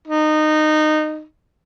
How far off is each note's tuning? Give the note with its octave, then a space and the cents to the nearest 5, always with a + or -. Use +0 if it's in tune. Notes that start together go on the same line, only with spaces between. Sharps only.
D#4 -20